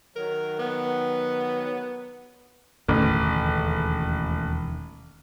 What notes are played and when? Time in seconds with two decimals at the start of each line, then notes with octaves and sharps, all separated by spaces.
0.16 D#3 F#3 A#4
0.59 B3
2.88 E1 A1 D#2 D3